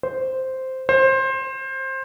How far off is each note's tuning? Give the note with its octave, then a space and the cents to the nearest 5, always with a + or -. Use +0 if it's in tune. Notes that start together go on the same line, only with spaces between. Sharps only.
C5 -5
C5 +20